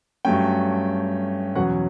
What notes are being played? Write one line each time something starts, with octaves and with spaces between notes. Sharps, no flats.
G2 F#3 A3 C#4 G5
E2 B2 F#3 C#4 F#5